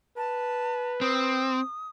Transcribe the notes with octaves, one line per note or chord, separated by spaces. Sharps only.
B4 A5
C4 D#6